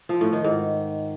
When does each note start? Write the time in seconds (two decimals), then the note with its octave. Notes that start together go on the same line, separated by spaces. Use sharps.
0.09 F3
0.21 A2
0.33 D#3
0.44 G#2